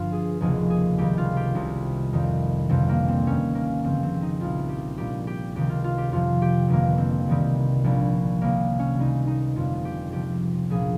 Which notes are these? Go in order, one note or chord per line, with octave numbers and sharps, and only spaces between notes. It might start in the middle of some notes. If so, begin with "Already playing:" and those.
Already playing: G1 G2 F3 F4
G#4
F1 D#2 C#3 F3 G#4
G#4
C#2 C3 D#3 G3 G4
F4
G4
C2 C3 G3
F2 D#3 G3
G1 F2 C3 G3 C4
A#3
C4
D#2 D#3 G3 C#4
A#3
G1 F2 C#3 F3 C4
C4
D#4
C2 A#2 G3 F4
G4
A#1 A#2 G3 G4
G4
C#2 C3 D#3 G4
F4
F4
G4
F2 C3 F3 F4
G4
G1 F2 D#3 G3 A#3
C4
C2 C3 D#3 G3
A#1 A#2 G3
C2 C3 G3 A#3
C#4
C#2 C3 G3 D#4
D#4
G1 F2 C3 G3 F4
G4
C#2 C3 F3 G4
A#1 A#2 F3 G#4